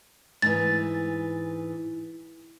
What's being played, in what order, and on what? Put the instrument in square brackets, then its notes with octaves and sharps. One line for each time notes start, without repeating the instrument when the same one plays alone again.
[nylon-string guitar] G#2 E3 [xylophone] A6